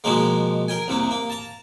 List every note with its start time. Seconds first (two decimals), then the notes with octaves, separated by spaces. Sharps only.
0.04 B2 D#3 F3 G#3 A#3
0.68 A#4 G5 G#5
0.88 C2 C3 A#3
1.11 A#3
1.30 A5 A#5